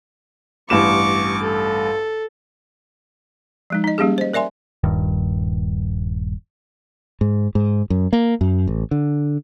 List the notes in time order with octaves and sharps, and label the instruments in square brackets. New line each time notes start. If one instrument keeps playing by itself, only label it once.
[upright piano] A1 G2 E7 [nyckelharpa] C#6 D6
[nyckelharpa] A4
[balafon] F3 G#3 D#4
D#4 D#5
G3 A#3 C#4 G4 G#4
C5 D#5
A#4 D5 E5 G#5 C6
[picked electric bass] D#1 G2 D#3
[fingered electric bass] G#2
G#2
F#2
A#3
F#2
A1
D3